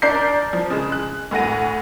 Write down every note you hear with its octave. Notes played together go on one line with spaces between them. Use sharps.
D4 A#4 D5 G6 C7
F3
C#3 G#3
F#6
D2 A2 F#5 A#6 D#7